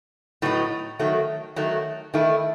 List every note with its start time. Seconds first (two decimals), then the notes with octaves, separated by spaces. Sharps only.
0.42 A2 F#3 B3 D#4
0.99 D#3 F#3 A3
1.56 D#3 F#3 A3
2.14 D#3 A3 E4